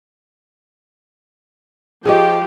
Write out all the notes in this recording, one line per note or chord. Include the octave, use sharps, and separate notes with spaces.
F3 G4 G#4 C#5 D#5 G5